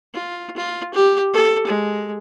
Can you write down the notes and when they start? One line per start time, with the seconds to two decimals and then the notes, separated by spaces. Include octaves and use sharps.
0.14 F4
0.56 F4
0.94 G4
1.34 A4
1.67 G#3